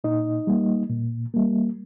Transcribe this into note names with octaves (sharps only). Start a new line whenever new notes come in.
A#2 D#4 D#5
G3 A#3
A#2
G3 A#3